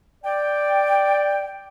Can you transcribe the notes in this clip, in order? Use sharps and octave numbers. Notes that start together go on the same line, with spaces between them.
D5 G5